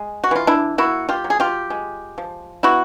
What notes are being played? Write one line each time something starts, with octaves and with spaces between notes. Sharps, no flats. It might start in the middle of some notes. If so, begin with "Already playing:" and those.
Already playing: G#3
F#4
E3 F4
D4 E4
A#3 E4 F#4
F4 G4
F#3
G#4
F4 G4
G#3
F3
B3 E4 F#4